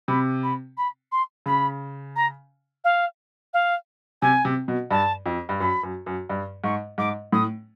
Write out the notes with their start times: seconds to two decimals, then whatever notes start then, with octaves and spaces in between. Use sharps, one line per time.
0.08 C3 B5
0.43 B5
0.77 B5
1.11 C6
1.46 C#3 B5
2.15 A#5
2.84 F5
3.53 F5
4.22 C3 G#5
4.45 C3
4.68 B2
4.91 G2 A5
5.26 F2
5.49 G2
5.60 F#2 B5
5.83 F#2
6.06 F#2
6.30 G2
6.64 G#2 C#6
6.98 G#2 D6
7.32 A2 D#6